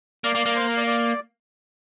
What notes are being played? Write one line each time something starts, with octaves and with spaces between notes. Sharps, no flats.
A#3 D5
A#3
A#3
C5
A#4
D5
D5